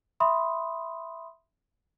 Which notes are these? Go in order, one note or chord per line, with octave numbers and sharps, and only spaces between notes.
E5 B5 C6 D#6